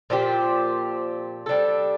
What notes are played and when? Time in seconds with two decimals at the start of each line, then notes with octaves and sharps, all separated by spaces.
0.10 A#2 F3 C4 G4
1.46 G3 D4 A4